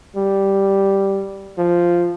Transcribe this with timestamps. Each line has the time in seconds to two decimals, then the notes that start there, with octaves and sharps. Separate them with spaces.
0.16 G3
1.58 F3